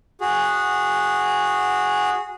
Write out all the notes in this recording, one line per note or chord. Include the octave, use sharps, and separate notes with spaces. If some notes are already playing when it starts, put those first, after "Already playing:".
F#4 G#4